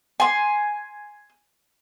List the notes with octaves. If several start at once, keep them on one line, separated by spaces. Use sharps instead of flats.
G#5 C6